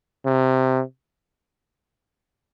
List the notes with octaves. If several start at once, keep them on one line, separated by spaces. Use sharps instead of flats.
C3